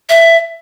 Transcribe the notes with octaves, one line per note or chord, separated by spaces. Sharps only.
E5